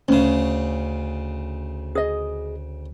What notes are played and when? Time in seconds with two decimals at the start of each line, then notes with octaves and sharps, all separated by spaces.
0.08 D2 C#3 C#4
1.95 G#4 D#5